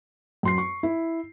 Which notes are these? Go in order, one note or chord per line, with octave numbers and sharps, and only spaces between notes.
F#2 C6 C7
C#6
E4